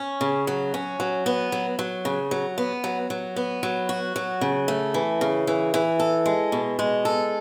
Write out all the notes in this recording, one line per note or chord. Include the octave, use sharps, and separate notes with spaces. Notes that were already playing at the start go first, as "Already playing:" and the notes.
Already playing: C#4
C#3
F#3
C#4
F#3
B3
F#3
F#3
C#3
F#3
B3
F#3
F#3
B3
F#3
F#4
F#3
C#3
A3
E3
C#3
E3
E3
A4
G#3
B2
G#3
A4